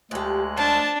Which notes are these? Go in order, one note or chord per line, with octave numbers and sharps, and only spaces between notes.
D2 F3 G#3 G4 F#6
F3 D4 A5